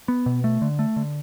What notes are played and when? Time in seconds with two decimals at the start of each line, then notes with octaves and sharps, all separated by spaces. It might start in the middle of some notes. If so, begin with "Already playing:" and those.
0.08 B3
0.26 B2
0.44 A3
0.62 D3
0.79 A3
0.96 D3